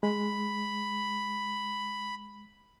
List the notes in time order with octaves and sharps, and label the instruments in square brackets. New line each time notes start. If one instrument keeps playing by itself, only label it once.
[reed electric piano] G#3 [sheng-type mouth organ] B5